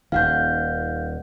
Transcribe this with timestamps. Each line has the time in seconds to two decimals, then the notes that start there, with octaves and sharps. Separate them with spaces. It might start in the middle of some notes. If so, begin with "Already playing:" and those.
0.12 D#1 D#3 F5 F#5 G6